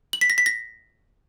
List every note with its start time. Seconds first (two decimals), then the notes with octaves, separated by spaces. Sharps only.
0.13 F#7
0.21 B6
0.30 A#6
0.38 B6
0.46 A#6